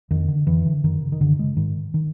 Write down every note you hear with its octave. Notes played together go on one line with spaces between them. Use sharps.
F2 D#3
D3
F2 E3
D3
F#2 D#3
C#3
D#3
F#2 D3
C#3 G#3
G#2 D#3
D#3